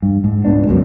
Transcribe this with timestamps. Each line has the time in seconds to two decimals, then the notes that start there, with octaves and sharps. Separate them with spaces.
0.02 G2
0.24 G#2
0.45 C#2 G#2 B3 D4
0.67 G1 C#2 F#2 B2